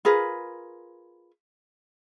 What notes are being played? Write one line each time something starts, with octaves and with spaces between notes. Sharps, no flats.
F4 G#4 A#4 B4